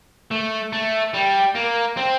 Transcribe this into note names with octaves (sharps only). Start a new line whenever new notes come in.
A3
A3
G3
A#3
C4